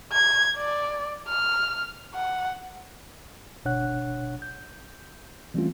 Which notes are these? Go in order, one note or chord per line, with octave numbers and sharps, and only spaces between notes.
G#6
D5
F6
F#5
G1 B2 D4 C#5 F#5 F#6
G6
E3 G3 A3 C4 C#4 F4